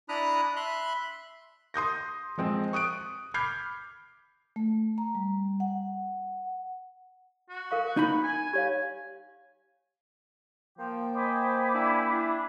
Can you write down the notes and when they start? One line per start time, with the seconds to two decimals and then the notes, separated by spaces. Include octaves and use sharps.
0.09 D4 E4 A#5 B5 D#6 F#6
0.56 E5 B5 C6 F#6
1.74 C6 D#6 G6 A#6
2.38 F3 G#3 C4
2.73 C#6 D#6 F#6 D7
3.34 B5 D6 F6 G6 G#6 C7
4.56 A3
4.98 A#5
5.15 G3
5.60 F#5
7.49 F#4
7.71 A#4 F5 C#6
7.97 D#4 B5
8.23 G#5
8.53 G4 C#5 F5 G#5
10.78 F3 A#3 G5
11.15 C5 D#5 G#5 B5 D6
11.74 D4 E4
12.10 D4 E4